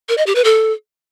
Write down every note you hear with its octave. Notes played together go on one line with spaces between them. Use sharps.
A#4
D#5
G4
B4
A4